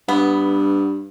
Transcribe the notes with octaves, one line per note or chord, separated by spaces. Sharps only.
G2 B3